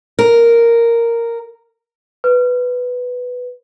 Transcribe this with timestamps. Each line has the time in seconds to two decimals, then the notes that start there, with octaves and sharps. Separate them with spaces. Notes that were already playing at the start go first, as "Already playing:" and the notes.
0.19 A#4
2.24 B4